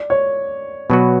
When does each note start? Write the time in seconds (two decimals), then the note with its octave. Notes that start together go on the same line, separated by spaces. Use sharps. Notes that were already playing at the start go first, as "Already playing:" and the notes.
Already playing: D5
0.10 C#5
0.90 B2 F#3 B3 F#4 B4